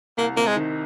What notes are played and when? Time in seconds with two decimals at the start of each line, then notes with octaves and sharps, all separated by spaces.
0.18 C2 A#3
0.37 C3 A#3
0.47 G#3
0.56 D#3